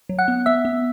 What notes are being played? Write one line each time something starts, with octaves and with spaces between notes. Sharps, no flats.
F#3
F#5 F#6
B3
B3 E5 E6
B3